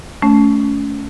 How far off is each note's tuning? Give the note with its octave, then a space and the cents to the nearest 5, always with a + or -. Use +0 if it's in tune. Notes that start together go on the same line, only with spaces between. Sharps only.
A3 -15 C#4 +25